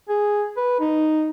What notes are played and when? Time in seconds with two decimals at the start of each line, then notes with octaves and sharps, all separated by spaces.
0.09 G#4
0.57 B4
0.80 D#4